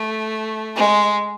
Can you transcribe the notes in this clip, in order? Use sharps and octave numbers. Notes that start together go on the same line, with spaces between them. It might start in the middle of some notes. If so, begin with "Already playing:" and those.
Already playing: A3
G#3